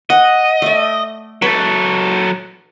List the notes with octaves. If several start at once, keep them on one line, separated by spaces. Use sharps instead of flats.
D#5 F#5
A3 D5
F#3 A4 B4